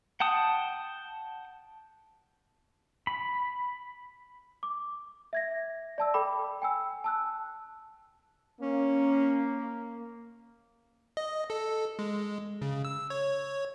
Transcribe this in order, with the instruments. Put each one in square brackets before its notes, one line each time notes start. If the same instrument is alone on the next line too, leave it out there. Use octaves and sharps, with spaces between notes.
[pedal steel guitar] F#5 G5 A5 D#6
B5
[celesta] D6
E5 G#6 A#6
D5 A5 E6
A4 G5 B5 D6
G5 G#5 E6
A5 E6 F#6
[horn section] A#3 [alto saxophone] C#4
[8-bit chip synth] D#5
A4
G#3
C#3
E6
C#5